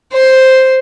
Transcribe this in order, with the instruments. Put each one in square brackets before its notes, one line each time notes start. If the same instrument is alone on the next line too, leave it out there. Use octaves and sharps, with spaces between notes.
[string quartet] C5